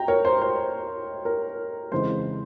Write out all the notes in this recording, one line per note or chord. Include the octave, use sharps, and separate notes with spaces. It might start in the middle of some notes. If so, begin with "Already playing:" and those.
Already playing: G5 A#5
A#4 C#5
C5
C5
A#4
F2 C#3 E3 G#3 C5